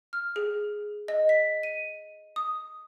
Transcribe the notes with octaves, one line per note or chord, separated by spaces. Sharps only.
F6
G#4
D#5
B6
D#7
D#6